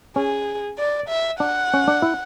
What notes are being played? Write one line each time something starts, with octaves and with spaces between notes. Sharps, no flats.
C#4 G#4
D5
E5
D4 F#5
C#4
D4
E4